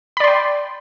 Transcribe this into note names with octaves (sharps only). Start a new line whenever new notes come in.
D5 G5 B5 C6